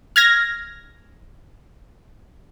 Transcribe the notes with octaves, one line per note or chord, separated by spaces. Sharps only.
F6 G#6 A#6